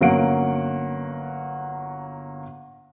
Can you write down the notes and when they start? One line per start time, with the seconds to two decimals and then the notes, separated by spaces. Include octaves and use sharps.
0.01 G1 F#3 A#3 C#4 F#5 D7